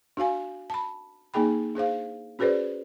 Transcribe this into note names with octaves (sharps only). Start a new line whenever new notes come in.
D4 F#4 F5 G#5
A5 B5
A#3 D#4 G#4 G5 B5
D4 G#4 C5 F5
C#4 F#4 G#4 B4 C5 D5